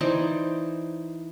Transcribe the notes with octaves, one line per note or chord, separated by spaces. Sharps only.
E3 D#4 C5 D5